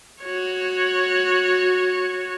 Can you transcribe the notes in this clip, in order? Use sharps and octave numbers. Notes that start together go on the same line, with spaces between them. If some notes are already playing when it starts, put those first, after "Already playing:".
F#4 C#5